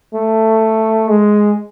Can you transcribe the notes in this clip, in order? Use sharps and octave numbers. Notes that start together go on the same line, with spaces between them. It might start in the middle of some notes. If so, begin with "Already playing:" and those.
A3
G#3